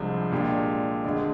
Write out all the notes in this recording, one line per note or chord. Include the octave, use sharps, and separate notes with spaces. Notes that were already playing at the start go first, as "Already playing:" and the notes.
Already playing: C2 C3 F3 G#3 D4
A#2 G#3 D4 G4
D2 D3 G#3